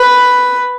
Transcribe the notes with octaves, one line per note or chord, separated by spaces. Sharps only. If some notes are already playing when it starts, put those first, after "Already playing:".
Already playing: B4